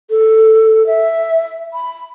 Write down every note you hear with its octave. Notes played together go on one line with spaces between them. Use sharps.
A4
E5
B5